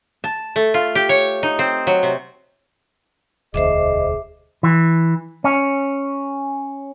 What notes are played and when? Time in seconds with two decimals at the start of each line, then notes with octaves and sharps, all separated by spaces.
0.24 A5
0.56 A3
0.74 F4
0.95 G4
1.09 C#5
1.43 D#4
1.59 C4
1.87 F#3
2.03 C3
3.54 E1 D2 G#4 C5 D#5 E5 D6
4.63 E3
5.44 C#4